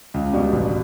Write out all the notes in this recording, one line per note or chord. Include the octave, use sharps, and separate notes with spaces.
C#2
B2 G3 D4
A1